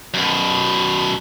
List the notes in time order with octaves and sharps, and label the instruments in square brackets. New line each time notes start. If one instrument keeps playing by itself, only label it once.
[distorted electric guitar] F#2 B2